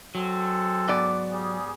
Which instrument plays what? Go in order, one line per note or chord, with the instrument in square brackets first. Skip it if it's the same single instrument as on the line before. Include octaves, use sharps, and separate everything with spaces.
[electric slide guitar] F#3 [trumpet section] G#3 C4 A4
[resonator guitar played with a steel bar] G#2 B3 D5
[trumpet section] G3 G#4